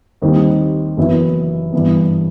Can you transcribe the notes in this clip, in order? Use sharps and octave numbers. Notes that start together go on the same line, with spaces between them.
D#2 D#3 G3 C4 D#4
F#1 F#2 E3 B3 E4
G2 E3 B3